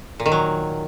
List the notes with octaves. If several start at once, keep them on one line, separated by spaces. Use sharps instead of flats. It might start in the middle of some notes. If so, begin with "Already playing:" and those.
A#2
D#3
F#3